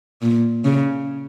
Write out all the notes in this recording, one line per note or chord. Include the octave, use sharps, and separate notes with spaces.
A#2
C#3